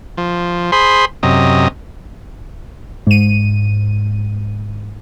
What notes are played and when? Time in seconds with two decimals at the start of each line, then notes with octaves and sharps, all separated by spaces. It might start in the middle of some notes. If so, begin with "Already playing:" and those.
0.18 F3
0.72 G#4 C5 B5 C6
1.23 F#2 C3 D#5
3.07 G#2 D#7